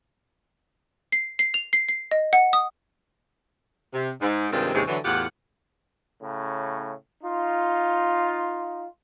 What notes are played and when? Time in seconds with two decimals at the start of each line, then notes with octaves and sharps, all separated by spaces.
1.12 C7
1.39 C7
1.54 F7
1.73 C7
1.89 C7
2.11 D#5
2.33 F#5
2.53 D#6
3.94 C3
4.21 G#2
4.53 G2 C3 D#3 G#3 C4 F4
4.75 D#2 G#2 C3 E3 G#3 C#4
4.88 D3 E3 F#3
5.05 E2 A2 F4 G4 F#5
6.21 A2 C#3
7.23 D#4 F4